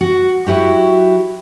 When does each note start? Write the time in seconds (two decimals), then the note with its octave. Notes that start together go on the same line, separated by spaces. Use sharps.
0.01 F#4
0.47 F#3 E4 F#4 G4